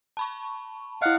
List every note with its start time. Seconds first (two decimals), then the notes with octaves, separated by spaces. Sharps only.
0.17 A5 B5 C#6
1.02 E4 D#5 F5 F#5